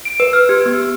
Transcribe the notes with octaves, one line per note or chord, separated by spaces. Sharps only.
D7
B4
F6
G4
B3